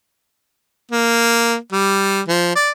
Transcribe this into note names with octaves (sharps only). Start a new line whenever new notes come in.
A#3
G3
F3
D5